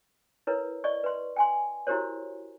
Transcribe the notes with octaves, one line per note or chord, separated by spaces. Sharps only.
E4 A#4 B4 C#5
D5 D#5 C#6
B4 C6
G5 G#5 C6
E4 F#4 G4 A#4 C5 C#5